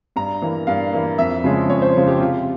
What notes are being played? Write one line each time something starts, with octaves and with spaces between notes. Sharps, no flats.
G2 A#5
E3 A#3
G2 F5
E3 A#3
F2 E5
C#3 F3 G#3 C#4
F2 C#5
C5
C#3 F3 G#3 C#4
G4
C3 F4